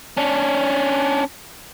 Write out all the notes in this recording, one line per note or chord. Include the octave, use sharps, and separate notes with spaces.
C#4 D4